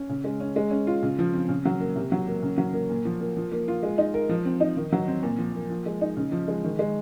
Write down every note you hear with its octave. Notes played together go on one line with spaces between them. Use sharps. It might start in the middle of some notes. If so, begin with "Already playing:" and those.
Already playing: C#4
C#3
G#3
C#4
G#3
C#4
F4
C#3
F3
C4
C#3
F#3
A#3
C3
F#3
A#3
C#3
F#3
A#3
A#2
F3
A#3
F3
A#3
F4
G#3
D#4
A#4
F3
C4
D#4
D#3
F#3
C4
A#2
F3
A#3
F3
G#3
D#4
C#3
F3
G#3
D#3
G#3